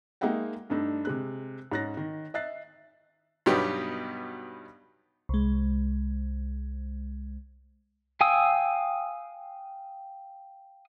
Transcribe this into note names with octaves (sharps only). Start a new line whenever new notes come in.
G#3 A#3 D#4 E5 F#5 G5
G2 A3 D4 D#4
C3 G#3 F#6
G#2 C#4 F#6 A6 A#6
D#3
D#5 E5 F#6 A6 C7
G2 B2 F#3 B3 D#4 G4
C2 G#3
F5 G5 G#5 D#6 E6